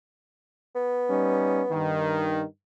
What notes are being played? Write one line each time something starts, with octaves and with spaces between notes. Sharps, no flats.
B3
G3 C#4 D#4
G2 D#3